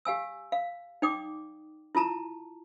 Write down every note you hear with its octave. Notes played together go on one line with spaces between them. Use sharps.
G4 F5 G#5 E6
F5
D#4 D5 G5 D6 D#6
E4 F4 A5 A#5